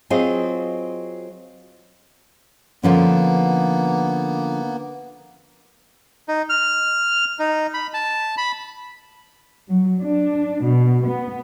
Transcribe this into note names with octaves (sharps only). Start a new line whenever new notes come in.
F#3 C4 F4 G#4 D#5
D3 F3 A#3 B3 C#4
D#4
F6
D#4
B5
A5
B5
F#3
D4
B2
B3